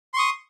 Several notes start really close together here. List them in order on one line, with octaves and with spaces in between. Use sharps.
C6 C#6 D#6